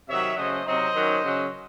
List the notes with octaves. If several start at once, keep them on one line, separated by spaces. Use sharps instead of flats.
C3 D#3 F#3 C#5 E5
C#3 F#3 A3 C#4 C5 D#5
C3 F#3 C4 D#4 C5 D#5
D#3 F#3 C#4
C#3 F#3 C#4